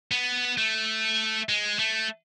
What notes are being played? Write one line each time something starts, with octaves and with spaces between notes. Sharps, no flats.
B3
A3
G#3
A3